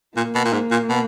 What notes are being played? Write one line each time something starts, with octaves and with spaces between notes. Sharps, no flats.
A#2 A#3
B2
A#2
G#2
A#2
B2